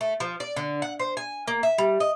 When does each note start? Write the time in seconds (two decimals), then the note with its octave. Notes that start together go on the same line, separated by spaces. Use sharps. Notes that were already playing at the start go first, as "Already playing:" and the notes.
0.01 A3
0.20 F3
0.40 D5
0.56 D3
0.82 F#5
0.99 C5
1.17 G#5
1.48 A#3
1.63 E5
1.78 G3
2.00 D#5